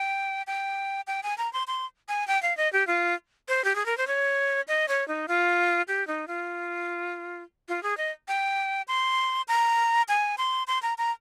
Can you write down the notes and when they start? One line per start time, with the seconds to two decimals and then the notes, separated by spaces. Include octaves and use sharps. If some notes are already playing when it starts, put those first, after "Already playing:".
Already playing: G5
0.47 G5
1.07 G5
1.23 G#5
1.38 A#5
1.53 C6
1.68 C6
2.08 G#5
2.28 G5
2.42 F5
2.57 D#5
2.73 G4
2.87 F4
3.48 C5
3.64 G4
3.75 G#4
3.86 A#4
3.97 C5
4.07 C#5
4.68 D#5
4.88 C#5
5.08 D#4
5.28 F4
5.88 G4
6.07 D#4
6.28 F4
7.69 F4
7.83 G#4
7.97 D#5
8.28 G5
8.88 C6
9.48 A#5
10.09 G#5
10.38 C6
10.67 C6
10.82 A#5
10.98 A#5